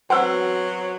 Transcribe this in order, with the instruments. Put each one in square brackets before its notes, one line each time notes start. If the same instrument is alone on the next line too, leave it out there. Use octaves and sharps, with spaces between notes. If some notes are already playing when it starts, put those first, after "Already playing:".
[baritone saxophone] F#3 [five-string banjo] B3 C5 [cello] C4 F#4 [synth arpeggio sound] F#5 E6